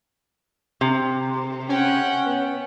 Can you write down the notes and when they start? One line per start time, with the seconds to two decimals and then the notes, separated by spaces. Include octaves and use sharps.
0.81 C3
1.69 C#4 F#5 G5
2.26 B3